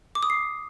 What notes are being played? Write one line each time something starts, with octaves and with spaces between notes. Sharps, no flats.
D6
D#6
C7